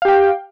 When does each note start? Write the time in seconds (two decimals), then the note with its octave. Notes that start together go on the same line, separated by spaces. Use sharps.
0.02 F5
0.05 G4
0.08 G5